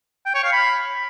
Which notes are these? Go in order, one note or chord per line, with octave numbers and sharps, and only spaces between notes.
G5
C#5
F5
B5